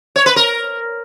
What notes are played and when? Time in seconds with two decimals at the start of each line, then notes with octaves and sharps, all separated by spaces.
0.16 C#5
0.26 B4
0.36 A#4